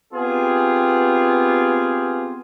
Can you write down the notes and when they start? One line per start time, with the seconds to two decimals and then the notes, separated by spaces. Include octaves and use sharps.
0.14 B3 C4 F4 G4 G#4